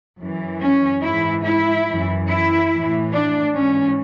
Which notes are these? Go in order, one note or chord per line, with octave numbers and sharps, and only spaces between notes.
F#2 E3
C#4
G#2 E3 E4
E4
F#2 E3
E4
A2 E3
D4
G#2 E3 C#4